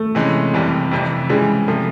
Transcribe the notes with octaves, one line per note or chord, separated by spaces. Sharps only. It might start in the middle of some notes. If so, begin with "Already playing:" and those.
Already playing: A3
C3 E3 G#3 C#4
F#1 F2 C3 E3 G3
F2 C3 E3
C#3 E3 G3 G#3
C3 F3 A3